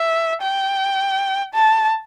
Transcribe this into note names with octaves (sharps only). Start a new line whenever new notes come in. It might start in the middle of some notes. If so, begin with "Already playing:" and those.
Already playing: E5
G5
A5